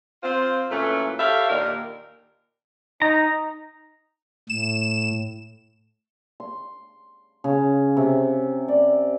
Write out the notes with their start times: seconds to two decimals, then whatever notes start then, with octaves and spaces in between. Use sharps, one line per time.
0.23 C4 F4 C5
0.70 F#2 A#2 E3 A3 C#4 F4
1.18 G4 A4 C#5 E5 F5
1.49 D#2 A#2 D#3 D4 D#4 A#4
3.02 D#4 A#5
4.50 A2 E7
6.40 C6
7.44 C#3
7.97 C3
8.68 D5